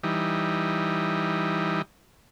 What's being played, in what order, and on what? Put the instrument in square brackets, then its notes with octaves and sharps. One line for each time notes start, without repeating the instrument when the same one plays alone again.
[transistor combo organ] E3 G3 D#4